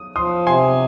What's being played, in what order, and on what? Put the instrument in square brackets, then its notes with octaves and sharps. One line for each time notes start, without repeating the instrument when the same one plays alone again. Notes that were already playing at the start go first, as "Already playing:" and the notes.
Already playing: [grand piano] D#6
[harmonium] F3 [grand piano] C6 D#6
[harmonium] C3 [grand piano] G#5 C6